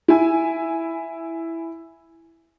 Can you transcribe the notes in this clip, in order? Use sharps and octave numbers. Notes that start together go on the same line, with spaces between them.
E4 G#5